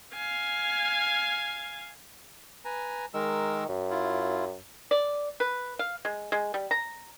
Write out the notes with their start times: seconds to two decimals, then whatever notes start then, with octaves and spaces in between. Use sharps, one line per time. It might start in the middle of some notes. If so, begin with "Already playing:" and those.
0.14 F5 G#5
2.65 B4 G#5 A#5
3.14 D#3 G#3 A#4 E6
3.68 F#2
3.90 E4 F4
4.91 D5
5.40 B4
5.79 F5
6.05 G#3
6.32 G#3
6.54 G3
6.71 A#5